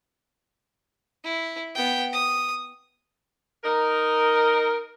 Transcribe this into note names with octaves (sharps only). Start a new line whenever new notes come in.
E4
B3 G5
D#6
D#4 A#4